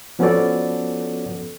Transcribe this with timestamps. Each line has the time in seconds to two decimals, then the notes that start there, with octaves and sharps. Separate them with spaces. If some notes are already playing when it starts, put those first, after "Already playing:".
0.19 F3 B3 C#4 F#4 A4 D5